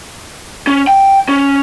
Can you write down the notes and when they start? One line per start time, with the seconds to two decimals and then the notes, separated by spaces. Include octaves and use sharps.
0.67 C#4
0.87 G5
1.29 C#4